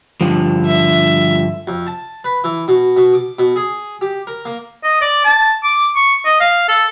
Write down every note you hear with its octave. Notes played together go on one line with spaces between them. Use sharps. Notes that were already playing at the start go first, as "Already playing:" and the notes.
G2 D3 F3
E5
F2
A5
B4
E3
B2
B2
D6
B2
G#4
G4
A#4
A#3
D#5
D5
A5
D6
C#6
D#5
F5
A4